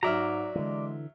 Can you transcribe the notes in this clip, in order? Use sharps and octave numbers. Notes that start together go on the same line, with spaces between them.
G#2 F#3 D5 E5 A#5 F6
D3 E3 G#3